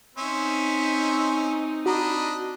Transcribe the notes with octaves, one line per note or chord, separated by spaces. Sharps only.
C4 C#4 D#4 C5 E5
D4 F#4 D#5 A#5 B5